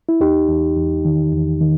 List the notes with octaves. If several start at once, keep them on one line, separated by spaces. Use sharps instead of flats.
E4
E2 D#4 G4
E2
E2
D#3
E2
D#3